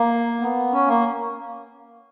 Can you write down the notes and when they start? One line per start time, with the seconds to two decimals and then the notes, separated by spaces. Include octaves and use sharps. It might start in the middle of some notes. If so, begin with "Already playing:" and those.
Already playing: A#3
0.40 B3
0.72 C#4
0.87 A#3